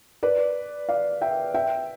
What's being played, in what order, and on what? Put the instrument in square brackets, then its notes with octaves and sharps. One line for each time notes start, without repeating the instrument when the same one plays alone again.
[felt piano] B4 D5
D5 F5
E5 G5
E5 G5